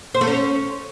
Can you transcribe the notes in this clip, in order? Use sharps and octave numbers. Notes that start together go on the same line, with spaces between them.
C5
A3
C#4